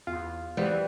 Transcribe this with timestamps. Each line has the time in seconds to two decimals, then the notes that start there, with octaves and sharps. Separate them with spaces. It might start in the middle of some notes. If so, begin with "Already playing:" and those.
0.07 E2 F4
0.57 E3 G3 B3 C4